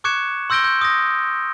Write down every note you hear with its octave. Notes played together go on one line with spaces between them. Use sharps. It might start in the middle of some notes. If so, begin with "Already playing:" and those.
C#6 D6 F#6 G#6 C#7 E7
C6 E6 G6 A#6 D7 G7
G6
D#6 A#6